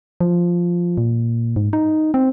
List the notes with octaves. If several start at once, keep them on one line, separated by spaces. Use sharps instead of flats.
F3
A#2
G#2
D#4
C4